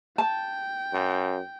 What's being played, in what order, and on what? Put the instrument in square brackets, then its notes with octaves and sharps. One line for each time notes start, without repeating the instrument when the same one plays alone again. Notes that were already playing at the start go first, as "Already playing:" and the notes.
[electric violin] G5 [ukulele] A5
[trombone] F#2